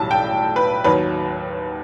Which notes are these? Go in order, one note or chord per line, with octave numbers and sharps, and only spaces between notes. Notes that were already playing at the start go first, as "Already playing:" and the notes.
Already playing: B1 A2 E3 G3 A5
G5
B4
D#2 D#3 F#3 B4